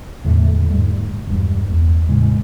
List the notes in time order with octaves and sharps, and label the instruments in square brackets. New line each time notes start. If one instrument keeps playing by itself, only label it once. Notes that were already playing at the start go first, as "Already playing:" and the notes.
[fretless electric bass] E2 A2 D3 A3
G#2 G3
E1 G2
E2
A2 C#3 G#3